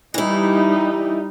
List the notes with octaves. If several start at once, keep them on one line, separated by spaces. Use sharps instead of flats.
E3 G3 D#4 E4